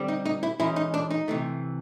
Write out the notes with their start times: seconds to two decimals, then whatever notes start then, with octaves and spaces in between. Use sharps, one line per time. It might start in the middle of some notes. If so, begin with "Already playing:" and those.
Already playing: D3 G3 C4
0.08 D#4
0.25 D#4
0.43 E4
0.60 G#2 E3 G#3 C#4 E4
0.76 D#4
0.94 D4
1.10 D#4
1.28 C3 E3 A3